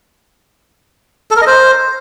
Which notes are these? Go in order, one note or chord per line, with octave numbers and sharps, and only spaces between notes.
A4
A#4
D#5
C5